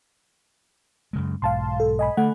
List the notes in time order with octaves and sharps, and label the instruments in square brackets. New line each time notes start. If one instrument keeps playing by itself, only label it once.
[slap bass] F#2 C#3 G#3
[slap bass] B1 G#2 [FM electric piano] F5 A5 C6
[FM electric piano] A4
D#5 G#5 B5
[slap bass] D3 [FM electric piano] A3 F#5